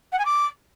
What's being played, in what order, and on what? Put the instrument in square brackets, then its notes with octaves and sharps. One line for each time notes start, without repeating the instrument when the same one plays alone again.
[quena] F#5
G#5
D6